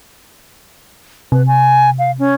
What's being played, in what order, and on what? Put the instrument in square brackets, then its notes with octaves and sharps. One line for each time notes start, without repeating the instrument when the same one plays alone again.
[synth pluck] C3 [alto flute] B4
[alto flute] G#5
F5
C#4